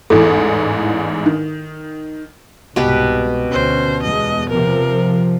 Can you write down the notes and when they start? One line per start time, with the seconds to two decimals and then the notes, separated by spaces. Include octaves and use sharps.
0.10 A1 E2 G#2 A4
1.26 D#3
2.76 C2 G#2 B2 G4 B4
3.52 D2 D3 C#4 C5
4.03 E2 G#3 D#5
4.49 C3 F3 A#4